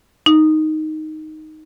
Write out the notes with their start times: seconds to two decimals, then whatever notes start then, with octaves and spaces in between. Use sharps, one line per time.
0.26 D#4